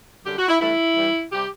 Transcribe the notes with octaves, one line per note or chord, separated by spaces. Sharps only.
F#2 D3 G3 G4
F#4
E4
G2 E3 A3 E4
G2 E3 G3
C3 G3 G4